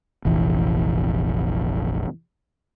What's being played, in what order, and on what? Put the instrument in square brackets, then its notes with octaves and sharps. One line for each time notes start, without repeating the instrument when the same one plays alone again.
[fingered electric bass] F1 A#1 E3